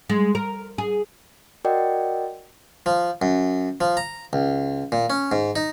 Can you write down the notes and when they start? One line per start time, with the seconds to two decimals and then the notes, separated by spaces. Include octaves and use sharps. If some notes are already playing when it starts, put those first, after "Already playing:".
0.10 G#3
0.35 A#4
0.78 G#4
1.64 F#4 A#4 D5 D#5 F#5 G5
2.86 F3
3.22 F#2
3.81 F3
3.97 A#5
4.33 C#2
4.92 A#2
5.10 C#4
5.32 G#2
5.56 D#4